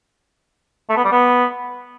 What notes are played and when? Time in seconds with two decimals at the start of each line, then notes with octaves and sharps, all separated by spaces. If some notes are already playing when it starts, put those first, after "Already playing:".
0.89 A3
0.97 B3
1.04 G3
1.12 B3